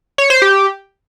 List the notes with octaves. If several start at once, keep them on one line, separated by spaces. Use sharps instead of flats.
C#5
C5
G4